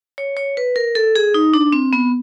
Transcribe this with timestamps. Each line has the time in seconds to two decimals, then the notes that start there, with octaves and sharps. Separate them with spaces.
0.18 C#5
0.37 C#5
0.57 B4
0.76 A#4
0.95 A4
1.15 G#4
1.34 D#4
1.54 D4
1.72 C4
1.93 B3